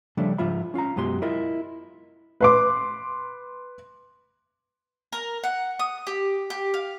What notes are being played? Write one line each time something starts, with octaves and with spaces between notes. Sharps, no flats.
C#3 F3 G3 A3 D4
G#2 F3 F4 E5 B5
C#4 F4 F5 A#5
F#2 B2 G#3 G4 C6
E4 F4 A#4 D#5 E5
B4 C6 D6
A#4
F#5
D#6
G4
G4
F5